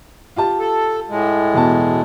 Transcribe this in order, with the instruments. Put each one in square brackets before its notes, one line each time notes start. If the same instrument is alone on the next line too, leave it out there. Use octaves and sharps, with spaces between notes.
[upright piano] F4 G4 A5
[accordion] A4
A2 G#3
[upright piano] E1 B2 A5